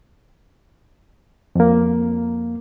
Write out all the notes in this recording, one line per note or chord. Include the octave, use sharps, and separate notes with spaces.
F2 A#3